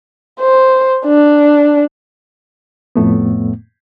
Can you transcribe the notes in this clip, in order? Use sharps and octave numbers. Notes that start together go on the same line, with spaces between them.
C5
D4
F2 A2 A3 B3